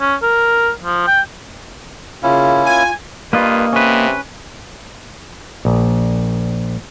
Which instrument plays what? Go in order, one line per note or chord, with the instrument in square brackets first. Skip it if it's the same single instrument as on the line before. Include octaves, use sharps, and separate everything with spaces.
[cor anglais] C#4
A#4
F3
G5
[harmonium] C#3 F4 [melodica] A#3 C#4 E4
[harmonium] F4 [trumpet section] G#5
[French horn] G2 [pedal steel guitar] A#3 D#5 [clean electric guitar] F4 B4
[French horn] C3 [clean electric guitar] C#4 B4
[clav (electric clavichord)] A#1